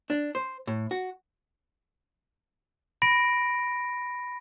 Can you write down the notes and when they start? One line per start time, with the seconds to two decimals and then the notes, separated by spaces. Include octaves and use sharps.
0.10 D4
0.35 C5
0.67 A2
0.91 F#4
3.02 B5 A#6 D7